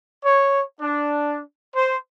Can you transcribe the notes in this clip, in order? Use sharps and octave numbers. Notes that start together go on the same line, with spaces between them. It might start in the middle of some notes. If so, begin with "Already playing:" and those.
C#5
D4
C5